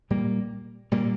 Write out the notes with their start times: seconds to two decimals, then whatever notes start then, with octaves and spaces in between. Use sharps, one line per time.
0.10 A#2 G3 A#3
0.92 A#2 G3 A#3